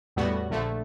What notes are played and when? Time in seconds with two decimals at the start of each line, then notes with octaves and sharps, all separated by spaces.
0.16 E2 A2 G3 B3 F#4
0.50 A#1 D3 A3